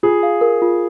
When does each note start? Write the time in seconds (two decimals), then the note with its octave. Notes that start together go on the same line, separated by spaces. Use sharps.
0.03 F4 G#4
0.23 F5
0.41 A#4
0.62 F4